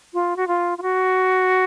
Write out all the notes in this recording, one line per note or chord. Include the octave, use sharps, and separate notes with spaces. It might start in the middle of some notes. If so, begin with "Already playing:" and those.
F4
F#4
F4
F4
F#4